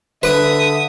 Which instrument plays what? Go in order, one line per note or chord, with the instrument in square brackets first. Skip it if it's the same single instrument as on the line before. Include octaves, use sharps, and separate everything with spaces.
[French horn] D3 [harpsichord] B4 [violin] E5 D#6